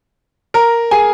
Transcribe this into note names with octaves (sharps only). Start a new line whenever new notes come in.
A#4 A#5
G#4 G#5